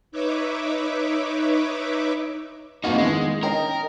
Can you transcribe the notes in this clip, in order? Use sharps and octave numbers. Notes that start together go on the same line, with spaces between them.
D#4 B4 C#5 E5 D6
F2 A#3 D#4 F#4 F5
D#3 G#3 B3 E4
C#4 A#4 D#5 G5